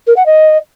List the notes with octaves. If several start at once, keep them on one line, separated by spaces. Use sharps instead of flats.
A#4
F#5
D#5